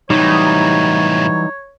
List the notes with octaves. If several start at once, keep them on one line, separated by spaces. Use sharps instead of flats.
A2 C3 E3 F#3 G3 D#4 C#5